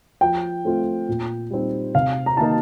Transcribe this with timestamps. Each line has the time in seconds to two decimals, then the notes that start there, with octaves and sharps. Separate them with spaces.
0.21 F3 G5
0.65 A3 C4 F4
1.08 A#2
1.50 G3 C4 D#4
1.95 C3 F5
2.26 A#5
2.37 D#3 A#3 D#4 A5